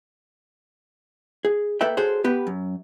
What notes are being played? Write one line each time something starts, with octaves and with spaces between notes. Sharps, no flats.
G#4
A#3 A4 B4 E5 G5
F#4 G#4 A4 C5 C#5
B3 G4 B4
F#2